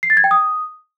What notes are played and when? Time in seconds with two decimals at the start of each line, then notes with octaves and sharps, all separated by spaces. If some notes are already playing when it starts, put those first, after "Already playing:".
0.03 C7
0.10 A6
0.17 G#6
0.24 G5
0.31 D#6